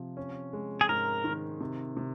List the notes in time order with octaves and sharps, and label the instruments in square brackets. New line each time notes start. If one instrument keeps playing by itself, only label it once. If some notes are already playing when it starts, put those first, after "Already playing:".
Already playing: [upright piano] C3 F3
C#4
G#3
[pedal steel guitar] G#4
[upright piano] G#2 [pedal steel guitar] A#4
[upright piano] D#3
C3
C3